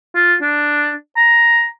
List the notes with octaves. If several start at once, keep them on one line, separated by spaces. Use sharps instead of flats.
F4
D4
A#5